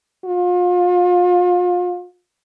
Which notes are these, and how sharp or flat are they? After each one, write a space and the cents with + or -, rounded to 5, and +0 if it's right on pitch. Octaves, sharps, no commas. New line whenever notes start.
F4 +35